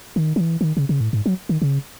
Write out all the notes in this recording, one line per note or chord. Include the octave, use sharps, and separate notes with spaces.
D#3
F#3
E3
E3
D#3
C#3
C#3
A2
G#2
F#3
D#3
C#3